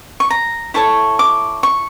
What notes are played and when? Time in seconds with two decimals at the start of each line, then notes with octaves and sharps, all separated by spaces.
0.20 C#6
0.30 A#5
0.74 E4 A4 C#5 C#6
1.19 D6
1.63 C#6